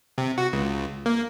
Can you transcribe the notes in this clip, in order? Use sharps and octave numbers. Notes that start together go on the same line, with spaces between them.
C3
F#4
C#2
A#3